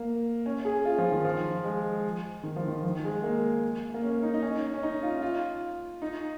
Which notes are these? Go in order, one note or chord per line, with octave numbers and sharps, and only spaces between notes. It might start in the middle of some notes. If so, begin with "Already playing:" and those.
Already playing: A#3
C#4
G#4
F4
F3
D#3
F3
G#3
D#3
F3
D#3
F3
G#3
A#3
A#3
C#4
D#4
D#4
C#4
C#4
D#4
F4
F4
D#4